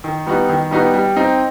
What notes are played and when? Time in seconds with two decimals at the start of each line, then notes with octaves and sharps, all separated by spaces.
0.04 D#3
0.26 G3 B3 D#4 F#4
0.49 D#3
0.71 G3 B3 D#4 F#4
0.94 G3
1.16 C4 D#4